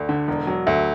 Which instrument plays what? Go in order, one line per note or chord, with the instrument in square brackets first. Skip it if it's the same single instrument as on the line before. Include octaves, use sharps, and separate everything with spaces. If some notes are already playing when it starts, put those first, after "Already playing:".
Already playing: [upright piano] D2 [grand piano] D5
[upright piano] D3
E1
F#3
[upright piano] D2 [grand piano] E5